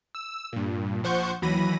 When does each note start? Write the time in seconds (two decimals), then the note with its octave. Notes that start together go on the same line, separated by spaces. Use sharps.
0.15 E6
0.53 G2 A#2
1.03 A#1 F3 C5 F#5 C#6 G6
1.42 D#2 E3 F#3 B5 A#6 D#7